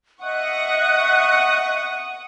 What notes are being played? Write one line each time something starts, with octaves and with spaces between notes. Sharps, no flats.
D#5 E5 F#5 C#6 D#6 F#6